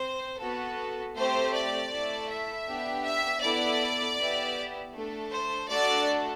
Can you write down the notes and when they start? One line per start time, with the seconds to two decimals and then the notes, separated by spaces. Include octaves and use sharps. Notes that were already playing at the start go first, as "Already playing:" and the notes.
Already playing: C4 C5
0.40 B3 F#4 A4
1.16 A3 C4 G4 C5
1.54 D5
1.91 A3 E4 A4
2.29 E5
2.67 B3 D4 G4
3.04 E5
3.42 B3 E4 A4 D5
4.18 B3 E4 G4
4.93 A3 D4 A4
5.31 C5
5.68 A3 D4 F#4 A4 D5